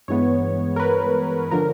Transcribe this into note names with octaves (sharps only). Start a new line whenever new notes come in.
G2 E3 G#3 B3 C#5
A#4
B4
D3 F3 A#4